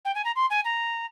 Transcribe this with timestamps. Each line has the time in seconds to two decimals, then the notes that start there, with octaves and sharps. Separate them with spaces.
0.05 G5
0.15 G#5
0.25 A#5
0.36 C6
0.50 G#5
0.65 A#5